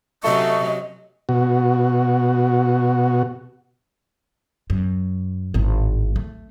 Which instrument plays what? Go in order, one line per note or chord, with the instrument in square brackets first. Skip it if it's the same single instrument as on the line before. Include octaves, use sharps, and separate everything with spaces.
[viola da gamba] C3 F#3 C#4 [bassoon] A3 [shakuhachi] D#5 [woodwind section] C#6
[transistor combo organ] B2 F#4
[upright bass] F#2
G#1 A2
A3